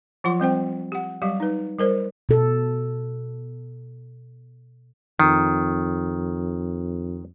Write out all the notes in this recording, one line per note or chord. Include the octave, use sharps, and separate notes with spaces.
F3 F#3 F4 F#5 C6 D6
G3 C4 C5 G5
G4 F#5
F#3 G3 G4 F5
D#4 B4
G3 A#4 C5 D5
B2 A4
F2 D#3